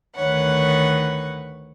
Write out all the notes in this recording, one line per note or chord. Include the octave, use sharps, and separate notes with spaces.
D2 D#3 B4 C#5 F#5